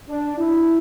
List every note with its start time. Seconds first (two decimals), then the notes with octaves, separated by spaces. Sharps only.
0.09 D4
0.38 E4